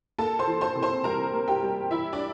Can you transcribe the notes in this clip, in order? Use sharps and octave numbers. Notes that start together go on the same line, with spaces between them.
A#3 A4 A5
C5 C6
E3
C5 C6
C3
C5 C6
G3 A#4 A#5
A#3
G4 G5
G3
E3 E4 E5
D4 D5